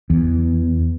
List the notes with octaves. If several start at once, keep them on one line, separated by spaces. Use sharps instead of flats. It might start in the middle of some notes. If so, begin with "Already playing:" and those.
E2